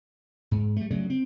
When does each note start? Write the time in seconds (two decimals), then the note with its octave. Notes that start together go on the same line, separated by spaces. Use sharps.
0.51 G#2
0.76 G3 A3
0.90 C#3 F#3 G3 A3
1.10 C4